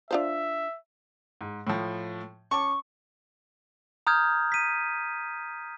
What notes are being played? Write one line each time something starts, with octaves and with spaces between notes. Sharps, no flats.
D4 F4 C5 E5
G#2
A2 F3
C#4 A5 C#6 D6
A#5 D#6 F6 G6 G#6
B6 D#7